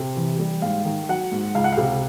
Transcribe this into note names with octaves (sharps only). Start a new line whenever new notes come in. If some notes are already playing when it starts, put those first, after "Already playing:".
Already playing: C3
E3
G3
G#2 F5
D#3
F#3 F#5
G#2
C#2 F5
F#5
C3 F5